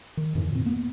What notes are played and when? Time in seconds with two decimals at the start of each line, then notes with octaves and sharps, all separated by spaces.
0.17 D#3
0.35 F2 G#2 D3 E3
0.52 A#2 C4
0.65 A#3 B3